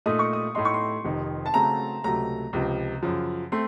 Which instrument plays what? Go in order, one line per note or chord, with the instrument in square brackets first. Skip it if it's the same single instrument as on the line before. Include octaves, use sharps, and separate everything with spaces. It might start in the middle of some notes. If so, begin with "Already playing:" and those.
[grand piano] A#2 A3 D#4 A4 [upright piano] D#6
[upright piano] C#6
D#6
[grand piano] A2 A3 D#4 [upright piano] C6
[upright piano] C#6
C6
[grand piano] F1 F2 C3 D#3
[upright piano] A5
[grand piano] C#3 A3 C4 F#4 [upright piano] A#5
[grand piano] C#2 C3 F#3 A3 [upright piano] A#5
[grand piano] C#2 C3 F3
F#2 C#3 F3
[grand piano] A3 C4 [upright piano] C6